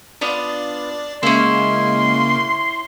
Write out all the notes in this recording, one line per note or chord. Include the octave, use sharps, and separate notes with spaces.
B3 D4 F4 D5
C#3 G#3 A#3 C#4 E4 C6